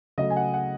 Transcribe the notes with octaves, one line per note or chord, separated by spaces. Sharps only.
C#3 F#3 A3 D#5
G#5
F#5
F#5